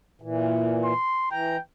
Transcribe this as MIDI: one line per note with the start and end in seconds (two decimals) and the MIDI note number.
0.22 0.93 46
0.22 0.93 52
0.84 1.29 84
1.31 1.57 52
1.31 1.60 79
1.31 1.57 82